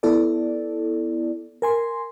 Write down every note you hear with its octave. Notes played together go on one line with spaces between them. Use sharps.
B3 E4 A4 D5
A#4 G#5 C6